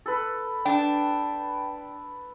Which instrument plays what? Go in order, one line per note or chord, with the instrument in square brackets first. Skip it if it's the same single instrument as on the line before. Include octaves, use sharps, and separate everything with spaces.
[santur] A4 B4
[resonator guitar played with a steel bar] D4 [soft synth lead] G5